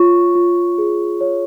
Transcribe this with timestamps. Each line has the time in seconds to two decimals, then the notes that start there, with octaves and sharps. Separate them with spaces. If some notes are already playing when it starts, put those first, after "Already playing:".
Already playing: F4 C#5 C#6
0.35 F4
0.78 G#4
1.21 C#5